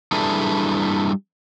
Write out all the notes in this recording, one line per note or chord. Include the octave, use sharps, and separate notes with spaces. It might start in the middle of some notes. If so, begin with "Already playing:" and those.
G3 D4 E4 G#4 A4 B4